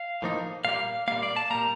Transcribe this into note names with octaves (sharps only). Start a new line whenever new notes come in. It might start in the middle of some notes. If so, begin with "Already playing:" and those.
Already playing: F5
A2 F3 A#3 D#4
A#2 G3 A#3 F5
A#2 G3 A#3 F5
D5
A5
A#2 G3 A#3 A#5